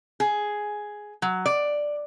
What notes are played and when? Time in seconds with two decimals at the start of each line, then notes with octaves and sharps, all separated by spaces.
0.20 G#4
1.22 F#3
1.46 D5